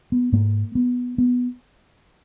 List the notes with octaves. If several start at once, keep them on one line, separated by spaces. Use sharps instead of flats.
B3
G#2 A#3
B3
B3